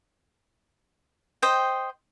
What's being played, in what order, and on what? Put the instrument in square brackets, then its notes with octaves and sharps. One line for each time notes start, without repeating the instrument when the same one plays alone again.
[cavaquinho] C5 D#5 G5